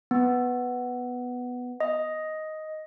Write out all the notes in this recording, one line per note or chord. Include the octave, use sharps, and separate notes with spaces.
B3
D#5